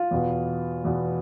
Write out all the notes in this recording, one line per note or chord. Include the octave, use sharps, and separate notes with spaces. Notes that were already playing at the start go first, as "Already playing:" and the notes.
Already playing: F4
E2 B2
E2 B2